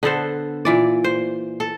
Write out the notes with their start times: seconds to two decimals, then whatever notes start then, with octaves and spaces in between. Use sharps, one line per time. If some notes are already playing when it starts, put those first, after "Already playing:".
0.03 D3 B3 A4 C5
0.65 A#2 E3 D5
1.04 C5
1.60 A4